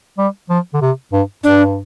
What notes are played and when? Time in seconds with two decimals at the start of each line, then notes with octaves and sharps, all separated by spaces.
0.18 G3
0.49 F3
0.74 D3
0.81 C3
1.12 G2
1.44 G2 D4